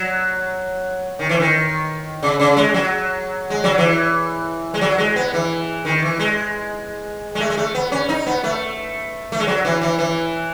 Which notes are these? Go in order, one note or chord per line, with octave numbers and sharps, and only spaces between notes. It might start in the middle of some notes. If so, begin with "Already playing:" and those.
Already playing: F#3
D#3
E3
D#3
C#3
C#3
G#3
F#3
G#3
F#3
E3
G#3
F#3
G#3
B3
E3
D#3
E3
G#3
G#3
A3
G#3
A3
B3
C#4
D#4
B3
A3
A3
G#3
F#3
E3
E3
E3